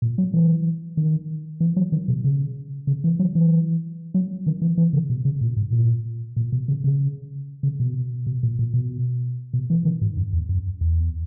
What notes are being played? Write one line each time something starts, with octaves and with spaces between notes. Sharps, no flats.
A#2
F#3
E3
D#3
E3
F#3
D#3
B2
C#3
C#3
E3
F#3
E3
F#3
D#3
E3
E3
C#3
B2
C#3
A#2
G#2
A#2
A#2
B2
C#3
C#3
C#3
B2
B2
A#2
A#2
B2
B2
E3
D#3
G#2
F#2
E2
F#2
E2